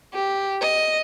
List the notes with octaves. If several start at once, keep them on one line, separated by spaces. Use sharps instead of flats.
G4
D#5